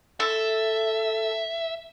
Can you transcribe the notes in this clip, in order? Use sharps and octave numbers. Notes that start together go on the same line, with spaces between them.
A4 E5